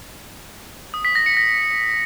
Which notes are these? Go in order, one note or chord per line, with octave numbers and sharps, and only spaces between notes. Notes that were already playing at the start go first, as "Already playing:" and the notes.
D#6
B6
A#6
C#7
A#6